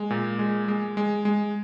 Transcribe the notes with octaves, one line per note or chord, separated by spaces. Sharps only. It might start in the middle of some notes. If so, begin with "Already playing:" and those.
Already playing: G#3
A#2
G#3
G#3
G#3
G#3